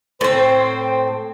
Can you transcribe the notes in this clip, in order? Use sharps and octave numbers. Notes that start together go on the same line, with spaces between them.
A2 C4 C5